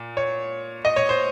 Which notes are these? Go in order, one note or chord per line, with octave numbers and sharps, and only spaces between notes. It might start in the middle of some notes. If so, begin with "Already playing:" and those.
Already playing: A#2
C#5
D#5
C#5
C5